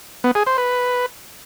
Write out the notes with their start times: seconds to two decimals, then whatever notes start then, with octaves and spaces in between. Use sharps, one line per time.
0.24 B3
0.35 G#4
0.47 C5
0.58 B4